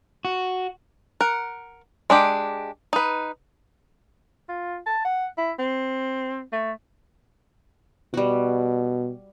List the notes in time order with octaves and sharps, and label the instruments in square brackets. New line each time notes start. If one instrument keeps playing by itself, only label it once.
[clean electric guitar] F#4
[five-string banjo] A#4 F#5
G#3 D4 G4
D#4 B4
[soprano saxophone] F4
A5
F#5
E4
C4
A3
[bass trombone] B2 [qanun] G3 F#4